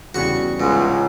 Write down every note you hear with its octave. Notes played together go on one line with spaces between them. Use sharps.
E2 C#3 G3 F#4 C#6
C#2 G#2